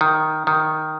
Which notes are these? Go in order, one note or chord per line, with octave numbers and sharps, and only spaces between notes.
D#3
D#3